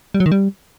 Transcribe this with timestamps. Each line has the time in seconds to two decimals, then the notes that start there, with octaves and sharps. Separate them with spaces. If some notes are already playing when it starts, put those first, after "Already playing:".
0.14 G3
0.20 F#3
0.26 D#3
0.32 G3